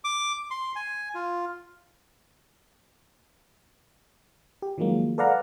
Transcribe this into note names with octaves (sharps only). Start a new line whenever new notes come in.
D6
C6
G#5
F4
G4
D#3 F3 F#3 G#3 A#3
A4 B4 D5 F5 F#5 A#5